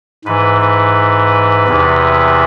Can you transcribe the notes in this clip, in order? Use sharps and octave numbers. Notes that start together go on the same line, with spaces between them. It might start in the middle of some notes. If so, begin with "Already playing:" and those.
G#2 E3 B4
B4
E2 C3 E3